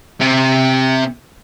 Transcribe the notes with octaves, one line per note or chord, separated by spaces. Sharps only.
C3